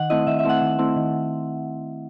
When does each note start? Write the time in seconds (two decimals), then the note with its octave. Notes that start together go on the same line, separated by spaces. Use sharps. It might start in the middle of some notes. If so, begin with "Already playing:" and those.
Already playing: D#3 F#5
0.10 A3 C4 E4 D#5
0.27 D#3 E5
0.39 E5
0.44 A3 C4 E4 F#5
0.61 D#3
0.79 A3 C4 E4
0.96 D#3